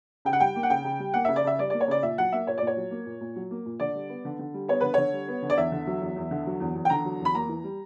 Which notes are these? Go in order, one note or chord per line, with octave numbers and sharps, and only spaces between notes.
C#3 G5
F#5
G3 G5
A#3
F#5
C#3 G5
C#3
G3
A#3 F#5
C#3 E5
D5
C#3 E5
G3 D5
A#3 D5
C#5
C#3 D5
A#2 E5
F#3 F#5
A#3 E5
A#2 C#5
A#2 D5
C#5
F#3
A#3
A#2
A#2
F#3
A#3
A#2
D3 D5
G3
B3
D3
D3
G3
B3 C#5
D3 B4
D3 C#5
G3
B3
D3
D5
E2 E5
D3
F#3
E2
E2
D3
F#3
E2
E2
G5
D3 A#5
F#3
E2 B5
A#3 A#5
E3
G3